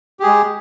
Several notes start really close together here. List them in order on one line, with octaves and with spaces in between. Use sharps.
G4 G#4 G#3